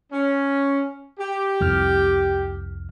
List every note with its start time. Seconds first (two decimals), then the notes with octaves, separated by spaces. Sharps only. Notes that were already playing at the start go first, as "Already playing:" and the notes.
0.12 C#4
1.19 G4
1.60 C2 F2 F6